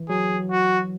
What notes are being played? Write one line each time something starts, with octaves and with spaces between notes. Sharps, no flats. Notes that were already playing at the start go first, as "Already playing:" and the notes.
Already playing: E3
F#3 G#4
F#4